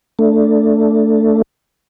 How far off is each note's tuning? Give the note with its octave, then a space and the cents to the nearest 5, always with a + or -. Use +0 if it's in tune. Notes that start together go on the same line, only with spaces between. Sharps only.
A3 +10 D4 +0